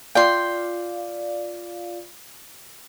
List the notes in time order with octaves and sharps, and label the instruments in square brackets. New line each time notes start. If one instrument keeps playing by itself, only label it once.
[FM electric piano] F4 D5 F5 [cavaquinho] G5 C6